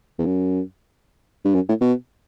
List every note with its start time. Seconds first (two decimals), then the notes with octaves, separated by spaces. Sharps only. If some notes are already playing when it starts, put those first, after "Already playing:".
0.18 E2
0.25 F#2
1.45 G2
1.55 F#2
1.68 A2
1.81 B2